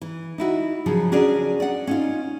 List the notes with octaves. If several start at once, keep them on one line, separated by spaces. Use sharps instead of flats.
E3
D#4 E4 F#4
C#3 F3 F#3 G#4
C#4 D4 F#4 G#4 A#4 D5
D5 F#5
C#4 D#4 F4